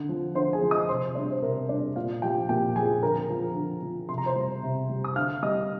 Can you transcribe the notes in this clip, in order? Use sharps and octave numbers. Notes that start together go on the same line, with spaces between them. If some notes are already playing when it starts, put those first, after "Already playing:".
Already playing: D3
F3
D3 C5 C6
G#4 G#5
F3
D#5 D#6
C3 C5 C6
G3 D4 D5
C5
C3 A#4
G3 D4 D5
A#2 F4 F5
F3 G4 G5
A#2 G4 G5
F3 G#4 G#5
D3 A#4 A#5
F3
D3
F3
C3 C6
A#5
C5 C6
G3
C3
G3
D#6
D3 F5 F6
G3 D#5 D#6